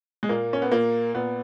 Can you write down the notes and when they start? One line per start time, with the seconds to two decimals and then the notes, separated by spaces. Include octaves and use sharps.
0.23 G#3
0.29 A#2 A#3
0.53 C#4
0.62 B3
0.72 A#2 A#3
1.14 A#2 B3